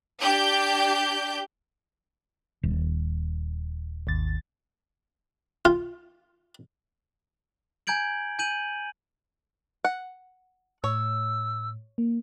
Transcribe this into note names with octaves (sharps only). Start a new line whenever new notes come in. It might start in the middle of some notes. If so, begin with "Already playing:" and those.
D4 G4 G6
D#1
G#1 D#2 A6
F4
G#5 A#5 G6 G#6 D7 F#7
G#5 G6 D#7 F#7
F#5
A2 C#5 E6
A#3